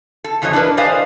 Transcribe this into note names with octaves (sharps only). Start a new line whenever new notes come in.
A4
F2 E3 F#3 C#4 C#5 D#5
D4 E4 G#4 A#4 B4
G4 C5 D5 D#5 F5 G#5